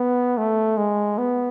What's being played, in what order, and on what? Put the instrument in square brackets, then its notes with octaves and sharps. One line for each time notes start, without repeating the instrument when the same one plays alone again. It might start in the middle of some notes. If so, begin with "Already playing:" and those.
Already playing: [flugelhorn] B3
A3
G#3
B3